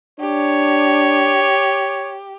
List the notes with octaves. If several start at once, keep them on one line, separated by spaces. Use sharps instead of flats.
D4 G4 C#5